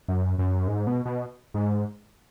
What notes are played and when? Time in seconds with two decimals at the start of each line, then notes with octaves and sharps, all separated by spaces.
0.08 F#2
0.39 F#2
0.68 G#2
0.87 B2
1.05 B2
1.54 G#2